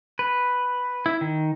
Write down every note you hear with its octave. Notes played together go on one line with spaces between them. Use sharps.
B4
E4
D#3